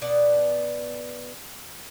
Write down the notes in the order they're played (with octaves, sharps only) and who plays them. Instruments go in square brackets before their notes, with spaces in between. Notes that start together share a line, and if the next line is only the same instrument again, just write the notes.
[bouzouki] B2 B3 D5 F#5